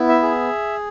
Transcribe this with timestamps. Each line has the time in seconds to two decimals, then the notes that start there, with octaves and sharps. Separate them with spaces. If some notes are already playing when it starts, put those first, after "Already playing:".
Already playing: B3 E4
0.09 E5
0.23 G#4